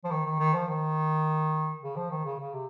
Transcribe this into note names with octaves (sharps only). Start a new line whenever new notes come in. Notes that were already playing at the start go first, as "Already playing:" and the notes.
F3
D#3
D#3
D#3
F3
D#3
C#3
F3
D#3
C#3
C#3
C3